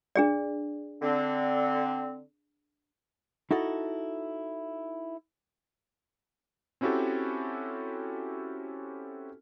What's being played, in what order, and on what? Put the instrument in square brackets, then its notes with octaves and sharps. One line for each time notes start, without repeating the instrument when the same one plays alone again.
[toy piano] D4 G#4 D5
[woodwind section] D3 C4
[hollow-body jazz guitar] D#4 E4 F#4 A4
[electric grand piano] C4 C#4 E4 F#4 G4 A4